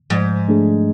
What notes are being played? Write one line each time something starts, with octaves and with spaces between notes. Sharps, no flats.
G#2 F3
A3 D4 G#4